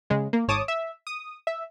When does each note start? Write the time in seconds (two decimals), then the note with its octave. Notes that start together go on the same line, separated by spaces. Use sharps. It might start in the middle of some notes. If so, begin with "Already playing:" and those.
0.10 C#3 G#3
0.33 A#3
0.48 G#1 C#5 A5 D6 D#6
0.68 E5
1.07 D#6
1.47 E5